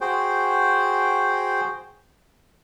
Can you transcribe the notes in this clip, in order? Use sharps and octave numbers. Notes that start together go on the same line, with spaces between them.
F#4 G#4 C5 G5